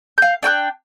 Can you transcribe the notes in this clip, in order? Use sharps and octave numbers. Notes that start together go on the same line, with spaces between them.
F5 G6
D4 G5 D6 F#6